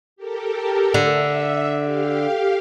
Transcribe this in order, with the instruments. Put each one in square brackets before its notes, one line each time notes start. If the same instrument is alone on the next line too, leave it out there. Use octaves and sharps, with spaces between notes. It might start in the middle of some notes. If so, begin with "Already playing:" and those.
[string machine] G4 A4 A#4
[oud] D3 [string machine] E5
[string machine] G4 F5